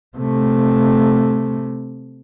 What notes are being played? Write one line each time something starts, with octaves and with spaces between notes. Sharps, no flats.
C3 A3